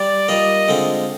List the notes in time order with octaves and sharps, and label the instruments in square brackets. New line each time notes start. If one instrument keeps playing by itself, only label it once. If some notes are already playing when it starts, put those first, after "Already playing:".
Already playing: [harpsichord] G3 [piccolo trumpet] D5
[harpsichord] G3 A#3 F4 [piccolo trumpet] D#5
[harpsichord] D3 G#3 C4 F4